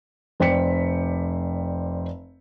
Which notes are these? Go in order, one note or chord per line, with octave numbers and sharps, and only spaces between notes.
F1 C5 D5 G5 B6 C#7